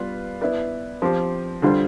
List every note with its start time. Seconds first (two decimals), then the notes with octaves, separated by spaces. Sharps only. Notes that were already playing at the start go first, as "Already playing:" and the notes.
Already playing: G3 B3 F4 B4 D5
0.41 B3 E4 B4 D5
1.02 F3 C4 G4 C5
1.62 D3 G3 D4 F4 C5